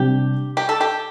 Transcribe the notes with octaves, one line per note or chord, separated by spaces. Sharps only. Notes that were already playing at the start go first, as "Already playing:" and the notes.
Already playing: C3 G3 D4 G4
G4
A4
G4